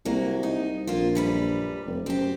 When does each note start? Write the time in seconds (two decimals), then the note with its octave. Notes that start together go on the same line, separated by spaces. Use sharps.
0.05 C2 F#3 A#3
0.43 D#4
0.87 A#1 A#3 F4
1.15 F#2 G3 B4
1.86 F1
2.06 F#2 C4 G4